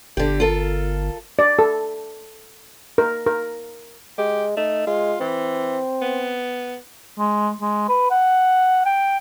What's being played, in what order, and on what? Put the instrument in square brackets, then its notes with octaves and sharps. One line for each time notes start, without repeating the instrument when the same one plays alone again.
[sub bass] G1 [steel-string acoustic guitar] D3 G4
[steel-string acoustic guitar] F4 A4 A#4
[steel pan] D5
A4
A#4
A#4
[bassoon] G#3 [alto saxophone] G4
[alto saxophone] A3 [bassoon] D#4
[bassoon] G#3 [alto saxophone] F4
[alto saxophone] E3 [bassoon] C4
[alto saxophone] B3
[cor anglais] G#3
G#3
B4
F#5
G5